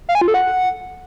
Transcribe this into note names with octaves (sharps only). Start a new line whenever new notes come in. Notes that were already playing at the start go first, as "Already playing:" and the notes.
F5
G#5
F4
A4
F#5